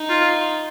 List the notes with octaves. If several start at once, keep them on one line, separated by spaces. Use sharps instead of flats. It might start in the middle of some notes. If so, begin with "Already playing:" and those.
Already playing: D#4
F4